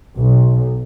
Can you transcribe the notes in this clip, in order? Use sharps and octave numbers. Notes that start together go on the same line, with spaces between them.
B1